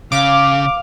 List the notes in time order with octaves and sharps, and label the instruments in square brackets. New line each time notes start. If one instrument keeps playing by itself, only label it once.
[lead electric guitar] C#3 [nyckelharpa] F5 [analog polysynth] D6